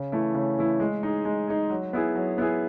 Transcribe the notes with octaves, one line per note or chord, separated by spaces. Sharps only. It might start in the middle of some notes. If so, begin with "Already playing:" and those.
Already playing: C#3
E3 A3 E4
C#3
E3 A3 E4
G#3
D#4 G#4
G#3
D#4 G#4
F#3
B3 E4 G#4
F#3
B3 E4 G#4